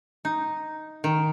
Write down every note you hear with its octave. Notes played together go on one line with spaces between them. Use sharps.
D#4
D#3